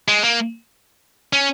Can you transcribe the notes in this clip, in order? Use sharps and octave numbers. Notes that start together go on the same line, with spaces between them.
G#3
A#3
C#4